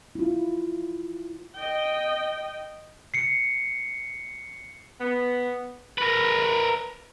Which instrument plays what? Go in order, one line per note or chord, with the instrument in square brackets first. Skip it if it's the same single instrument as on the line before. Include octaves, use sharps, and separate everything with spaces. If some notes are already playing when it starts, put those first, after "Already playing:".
[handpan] E4 F4
[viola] D#5 G5
[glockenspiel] C7 C#7
[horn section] B3
[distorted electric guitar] A#4 B4